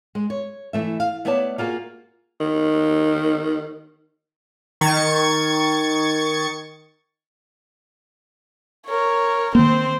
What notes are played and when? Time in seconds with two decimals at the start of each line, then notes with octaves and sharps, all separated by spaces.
0.15 G#3
0.30 C#5
0.73 E3 A3 E5
1.00 F5
1.25 A3 B3 C#5 D5 E5 A5
1.58 A#3 F4 F#4 G#4
2.40 D#3
4.81 D#3 C#6 G#6 A6 C#7
8.87 A#4 C#5
9.55 D#3 A#3 C4 C5